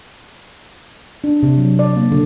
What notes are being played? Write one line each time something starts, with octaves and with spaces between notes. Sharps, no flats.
D4
C3
F#3
D5
A#3
D3